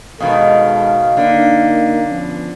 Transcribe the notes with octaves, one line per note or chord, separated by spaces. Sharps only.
G#2 B2 D#3 A4 F5
D3 A#3 D#4
F3 B3 C#4